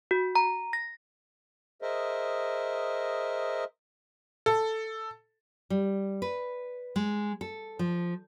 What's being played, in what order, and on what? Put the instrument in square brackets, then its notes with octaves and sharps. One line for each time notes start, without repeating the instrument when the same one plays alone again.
[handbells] F#4
A#5
A#6
[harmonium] G#4 A#4 C5 D#5 E5
[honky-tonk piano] A4
[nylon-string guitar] G3
B4
G#3
A4
F3